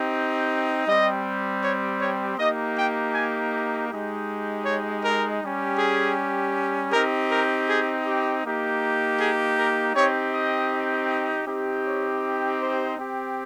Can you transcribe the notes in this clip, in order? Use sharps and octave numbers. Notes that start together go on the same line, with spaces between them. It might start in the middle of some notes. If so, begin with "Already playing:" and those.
Already playing: C4 D#4 G4
G3 C4 G4 D#5
C#5
C#5
A#3 D#4 G4 D#5
G5
G#5
G#3 D#4 G4
C#5
A#4
G3 C#4 G4
G#4
C4 D#4 G4 A#4
A#4
G#4
G4
A#3 D#4 G4
G#4
A#4
C4 D#4 G4 C#5
D#5
C4 D#4 G4
C#5
C5
C4 G4